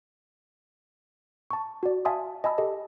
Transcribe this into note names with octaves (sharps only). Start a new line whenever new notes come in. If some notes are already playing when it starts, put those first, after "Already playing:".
A5 C#6
F#4 D5
E5 F5 G#5 A5 C6 D#6
D#5 G#5 A5 B5 E6
G4 A4 D#5